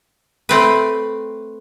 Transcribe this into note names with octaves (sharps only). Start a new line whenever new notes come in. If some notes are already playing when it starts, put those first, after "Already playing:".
A3 C4 B4